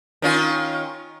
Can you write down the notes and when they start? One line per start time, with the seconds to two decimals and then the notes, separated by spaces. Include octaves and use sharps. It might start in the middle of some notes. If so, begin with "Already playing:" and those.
0.22 D#3 C#4 F4